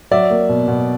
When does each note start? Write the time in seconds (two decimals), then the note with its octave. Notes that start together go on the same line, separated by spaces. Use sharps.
0.11 F#3 D5 E5
0.30 A#3
0.49 B2
0.68 B2